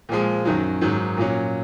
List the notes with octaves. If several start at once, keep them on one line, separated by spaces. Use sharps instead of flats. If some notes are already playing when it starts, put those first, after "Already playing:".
A#2 F3 G#3
F#2 D#3 F#3
G#2 D#3 F#3
A#2 F#3 C#4